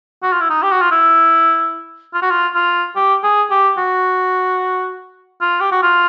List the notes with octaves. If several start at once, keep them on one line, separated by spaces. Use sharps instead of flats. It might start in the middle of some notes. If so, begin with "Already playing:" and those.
F#4
F4
E4
D#4
G4
F#4
F4
E4
F4
F#4
F4
F4
G4
G#4
G4
F#4
F4
G4
F#4
F4